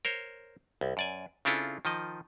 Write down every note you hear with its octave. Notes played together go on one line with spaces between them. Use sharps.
A#4 C5 C#5
C2
F#2 D5 G#5
C#3 C4 D4 E4 F4 A4
D#3 F3 D#5